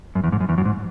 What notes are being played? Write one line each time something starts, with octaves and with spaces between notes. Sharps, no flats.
F#2
E2
G#2
F#2
E2
F#2
G#2